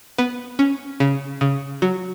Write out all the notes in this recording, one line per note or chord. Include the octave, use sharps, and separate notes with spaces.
B3
C#4
C#3
C#3
F#3